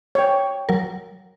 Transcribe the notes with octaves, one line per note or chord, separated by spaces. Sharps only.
C#5 G5
F#3 A#4